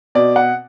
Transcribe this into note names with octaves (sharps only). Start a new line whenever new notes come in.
B2 D5
F#5